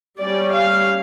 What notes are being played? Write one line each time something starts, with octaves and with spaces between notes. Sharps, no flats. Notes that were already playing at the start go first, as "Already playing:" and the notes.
G3 C#4 D5
F5